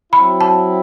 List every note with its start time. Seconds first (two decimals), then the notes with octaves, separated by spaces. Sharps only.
0.13 F#3 C4 E4 B5
0.41 A5